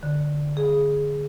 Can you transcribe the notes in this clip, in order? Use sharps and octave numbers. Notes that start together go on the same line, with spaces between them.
D3
G#4